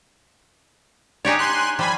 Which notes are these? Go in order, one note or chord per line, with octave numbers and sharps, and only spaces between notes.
D4 D#4 G4 G#4 C#5
G#5 C6 F#6
F3 G3 G#5 B5 C6